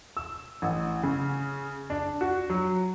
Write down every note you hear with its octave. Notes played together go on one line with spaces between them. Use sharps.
E6
A1
C#3
D4
F#4
F#3